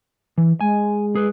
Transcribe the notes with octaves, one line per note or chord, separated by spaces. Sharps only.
E3
G#3 G#5
G#4 B4